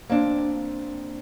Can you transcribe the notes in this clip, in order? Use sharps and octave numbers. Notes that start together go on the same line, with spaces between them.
A#3 C4 D4